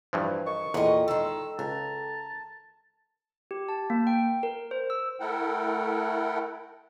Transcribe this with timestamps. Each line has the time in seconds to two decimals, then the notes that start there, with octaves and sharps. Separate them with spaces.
0.13 G2 E3 F3 C5
0.47 A#4 D#5 C#6
0.74 E2 A#2 A4 D#5 G5
1.08 D#3 G#3 E6
1.59 C#2 A#4 A5
3.51 G4
3.69 A5
3.90 A#3
4.07 G5
4.43 A#4
4.71 C5
4.90 E6
5.19 A3 E4 A4 A#4 F#5 G5